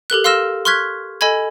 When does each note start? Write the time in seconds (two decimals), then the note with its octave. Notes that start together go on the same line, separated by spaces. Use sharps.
0.10 G4 A4 A#4 F#6
0.24 F5 C6 E6 F6 A#6 E7
0.65 C6 C#6 F6 F#6 G#6 B6
1.21 A4 D#5 G#5 B5 G#6